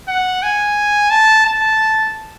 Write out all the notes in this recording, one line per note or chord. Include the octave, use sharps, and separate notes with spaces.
F#5
G#5
A5
A5